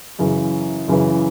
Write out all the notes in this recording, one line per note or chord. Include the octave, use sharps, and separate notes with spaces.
F#2 C#3 E3
F#2 C#3 E3